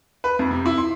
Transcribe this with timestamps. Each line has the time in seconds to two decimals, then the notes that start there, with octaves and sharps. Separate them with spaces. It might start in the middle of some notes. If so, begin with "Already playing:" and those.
0.24 B4
0.39 F2
0.51 C3
0.66 E4
0.78 C6